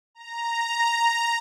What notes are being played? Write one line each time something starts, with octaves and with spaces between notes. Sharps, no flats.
A#5